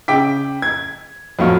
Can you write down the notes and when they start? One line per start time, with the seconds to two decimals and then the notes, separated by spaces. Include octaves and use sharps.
0.08 C#3 G5 D6 B6
0.62 G#6
1.39 F2 A2 F#3 F5 C#6 F6